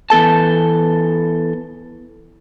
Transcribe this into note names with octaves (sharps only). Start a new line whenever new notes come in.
E3 B3 A4 A5